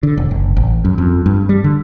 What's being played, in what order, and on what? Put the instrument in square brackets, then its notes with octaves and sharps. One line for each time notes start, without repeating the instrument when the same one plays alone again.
[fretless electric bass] D3
E1
F#1
A1
F#2
F2
G2
G3
D3